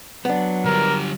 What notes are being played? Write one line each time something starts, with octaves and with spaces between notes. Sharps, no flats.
F#3 B3 D4
D3 G3 A#4